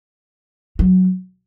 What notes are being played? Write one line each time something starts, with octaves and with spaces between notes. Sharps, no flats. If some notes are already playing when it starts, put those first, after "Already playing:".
F#3